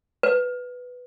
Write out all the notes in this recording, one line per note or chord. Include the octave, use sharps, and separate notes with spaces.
B4